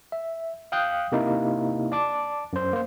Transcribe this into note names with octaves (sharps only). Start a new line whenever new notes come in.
E5
F5 G5 D#6 F#6 G6
C3 A#3 D#4 E4
D5 A5 D6
F#2 C5
A#3 C5